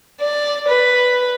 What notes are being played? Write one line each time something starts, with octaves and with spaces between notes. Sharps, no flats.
D5
B4